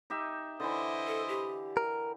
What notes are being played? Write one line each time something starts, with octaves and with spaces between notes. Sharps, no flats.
D#4 G4 E5
D3 E3 E4 C5 D#5
A4
G4
A#4